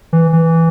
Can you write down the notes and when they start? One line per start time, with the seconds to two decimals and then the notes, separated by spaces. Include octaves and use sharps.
0.13 E3
0.33 E3